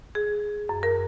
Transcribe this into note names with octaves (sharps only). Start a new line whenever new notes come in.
G#4
F#2
A#4